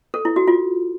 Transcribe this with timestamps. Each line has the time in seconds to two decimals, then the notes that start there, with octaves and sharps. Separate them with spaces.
0.14 A4
0.25 E4
0.36 F#4
0.48 F4